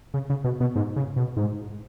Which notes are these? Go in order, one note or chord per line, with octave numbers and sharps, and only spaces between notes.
C#3
C#3
B2
B2
G#2
C#3
B2
G#2